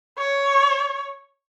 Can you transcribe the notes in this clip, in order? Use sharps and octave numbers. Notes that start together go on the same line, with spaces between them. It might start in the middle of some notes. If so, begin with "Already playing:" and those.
C#5